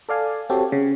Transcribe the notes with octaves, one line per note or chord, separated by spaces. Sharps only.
A4 D5 F5 G#5
C4 F#4 G4 A4 C#5
C#3